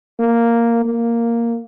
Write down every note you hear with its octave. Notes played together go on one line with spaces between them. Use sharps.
A#3
A#3